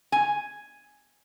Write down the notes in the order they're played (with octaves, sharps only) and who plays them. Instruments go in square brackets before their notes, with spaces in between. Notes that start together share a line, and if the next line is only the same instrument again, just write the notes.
[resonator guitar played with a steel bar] G#5